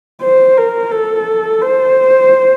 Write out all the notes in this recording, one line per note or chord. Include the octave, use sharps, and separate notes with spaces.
C5
A#4
A4
C5